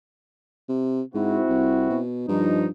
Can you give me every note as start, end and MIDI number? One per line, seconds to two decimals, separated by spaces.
0.69 1.02 48
1.14 1.40 44
1.14 1.99 60
1.14 1.99 64
1.14 1.99 66
1.49 1.88 36
1.90 2.26 47
2.28 2.68 43
2.28 2.67 53
2.28 2.67 63